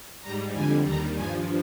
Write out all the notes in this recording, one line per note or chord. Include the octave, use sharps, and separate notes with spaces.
G#2 G3 A#5
F2 D3 G3 G#5
D#2 D#3 G3 A#5
G2 F3 G#5